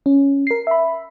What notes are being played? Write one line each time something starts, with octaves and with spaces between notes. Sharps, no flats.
C#4
A#4 C7
E5 B5